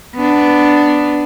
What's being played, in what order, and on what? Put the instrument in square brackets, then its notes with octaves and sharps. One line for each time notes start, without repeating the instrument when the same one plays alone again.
[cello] B3 D4